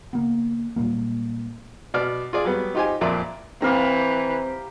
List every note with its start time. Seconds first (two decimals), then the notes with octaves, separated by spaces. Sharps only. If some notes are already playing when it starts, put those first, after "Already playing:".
0.13 C#3 A#3 B3
0.76 A#2 F#3 G3 A#3
1.94 B2 D5 F6
2.33 F4 G#4 D5
2.45 F#3 G3 B3
2.75 D#4 F4 G4 C5 G#5
3.01 F2 A#2 E4 F4 A#4 D5
3.62 E3 C4 G4 F5 A#5